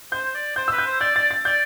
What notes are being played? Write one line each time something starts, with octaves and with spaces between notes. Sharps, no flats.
C5 G6
D5
C5 G6
B4 E6
G6
C5
D5 G6
D5 A6
A6
D5 G6